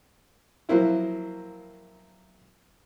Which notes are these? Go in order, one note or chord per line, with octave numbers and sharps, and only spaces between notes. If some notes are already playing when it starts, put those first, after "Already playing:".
F3 F#3 A#3 C4 E4 F4